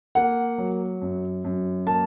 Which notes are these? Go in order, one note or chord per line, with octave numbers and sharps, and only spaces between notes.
A#3 F#5
F#3
F#2
F#2
A#3 A5